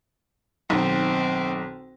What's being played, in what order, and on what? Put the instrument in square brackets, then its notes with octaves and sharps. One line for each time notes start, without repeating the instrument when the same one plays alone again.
[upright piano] B1 D#3 [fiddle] C4